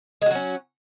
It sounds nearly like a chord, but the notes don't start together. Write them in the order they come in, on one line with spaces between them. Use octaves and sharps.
G#3 F#4 F#3 C#4